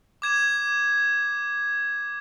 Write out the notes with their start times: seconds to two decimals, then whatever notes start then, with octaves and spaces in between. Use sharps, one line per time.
0.22 D6 G#6 E7